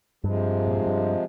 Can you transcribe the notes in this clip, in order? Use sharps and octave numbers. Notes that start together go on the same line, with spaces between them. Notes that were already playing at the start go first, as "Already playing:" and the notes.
G2 C3 F3 G#3
A#2
G#2
G2